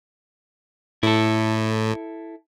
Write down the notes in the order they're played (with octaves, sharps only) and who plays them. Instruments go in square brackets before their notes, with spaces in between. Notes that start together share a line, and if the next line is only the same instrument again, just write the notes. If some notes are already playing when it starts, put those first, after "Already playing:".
[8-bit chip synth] A2 [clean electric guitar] E4 A4